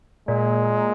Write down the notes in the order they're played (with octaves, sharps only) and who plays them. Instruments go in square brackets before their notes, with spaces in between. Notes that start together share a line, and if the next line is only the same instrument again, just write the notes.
[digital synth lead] A#2 [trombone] G#3